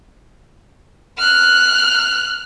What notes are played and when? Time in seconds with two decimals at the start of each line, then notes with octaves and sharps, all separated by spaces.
1.18 F6 F#6